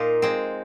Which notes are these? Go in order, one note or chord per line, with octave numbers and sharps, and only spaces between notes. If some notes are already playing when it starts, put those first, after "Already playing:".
Already playing: A#2 D#4 F4
G#3 C4